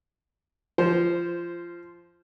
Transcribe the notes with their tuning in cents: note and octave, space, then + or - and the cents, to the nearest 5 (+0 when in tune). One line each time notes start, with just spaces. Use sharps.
F3 -20 C5 +0